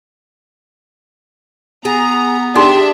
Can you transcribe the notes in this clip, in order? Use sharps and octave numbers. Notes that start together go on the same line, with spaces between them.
B3 G#4 A#5
D4 D#4 G4 G#4 E5 C6